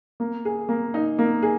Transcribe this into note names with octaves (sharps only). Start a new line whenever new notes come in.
A#3
G#4
A#3
D#4
A#3
G#4